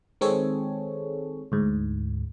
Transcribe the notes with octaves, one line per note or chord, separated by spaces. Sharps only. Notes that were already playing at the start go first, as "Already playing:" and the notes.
D#3 G#3 C4 G#4 A4 C#5
D2 G#2